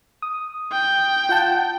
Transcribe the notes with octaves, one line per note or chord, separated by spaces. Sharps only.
D#6
G5
F4 F#5 A5